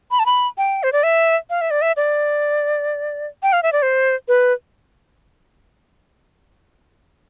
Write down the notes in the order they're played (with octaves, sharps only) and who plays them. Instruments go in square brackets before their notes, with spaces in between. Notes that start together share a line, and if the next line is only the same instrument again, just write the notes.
[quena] B5
A5
B5
G5
C5
D5
E5
F5
E5
D5
E5
D5
G5
F5
E5
D5
C5
B4